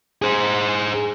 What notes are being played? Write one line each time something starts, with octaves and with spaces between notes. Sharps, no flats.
G#4 C5